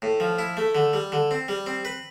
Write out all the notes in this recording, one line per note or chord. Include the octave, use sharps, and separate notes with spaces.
A2
F3
E4
A3
D3
G3
D3
C4
G3
C4
B4